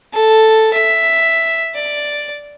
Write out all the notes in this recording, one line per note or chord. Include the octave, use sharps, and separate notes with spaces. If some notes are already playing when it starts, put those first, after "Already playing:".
A4
E5
D5